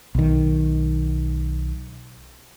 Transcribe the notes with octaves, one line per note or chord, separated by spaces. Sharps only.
B1 D#3